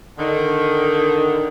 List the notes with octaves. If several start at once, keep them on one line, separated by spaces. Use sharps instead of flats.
D3 D#3